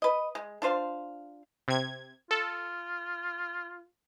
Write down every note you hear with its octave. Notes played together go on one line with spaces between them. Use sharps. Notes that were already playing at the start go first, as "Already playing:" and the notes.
B4 D#5
G#3
D4 F4 C5 F5
C3 G#6
F4 A4